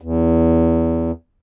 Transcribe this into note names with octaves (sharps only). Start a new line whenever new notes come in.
E2